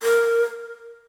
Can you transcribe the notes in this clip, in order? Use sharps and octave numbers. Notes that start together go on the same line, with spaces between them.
A#4